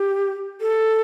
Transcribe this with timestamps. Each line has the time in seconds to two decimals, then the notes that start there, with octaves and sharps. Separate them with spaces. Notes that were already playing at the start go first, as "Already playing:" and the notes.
Already playing: G4
0.61 A4